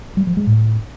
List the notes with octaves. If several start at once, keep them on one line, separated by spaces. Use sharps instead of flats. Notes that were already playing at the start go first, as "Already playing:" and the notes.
G3
F3
G#3
A2